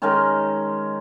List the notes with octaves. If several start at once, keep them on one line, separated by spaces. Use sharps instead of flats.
D#3 G#3 C#4 A#4